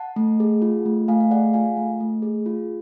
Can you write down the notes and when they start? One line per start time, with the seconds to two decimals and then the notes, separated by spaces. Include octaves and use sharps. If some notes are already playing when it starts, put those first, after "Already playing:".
Already playing: F#5 A5
0.16 A3
0.40 G#4
0.62 F4
0.86 A3
1.08 A3 F5 G#5
1.20 F5
1.31 G#4 D5 F#5
1.54 F4 F5 G#5
1.77 A3
2.00 A3
2.22 G#4
2.46 F4